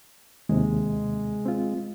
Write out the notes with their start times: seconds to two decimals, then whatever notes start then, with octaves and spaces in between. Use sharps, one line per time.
0.49 D#2 C3 G#3
1.46 C4 F4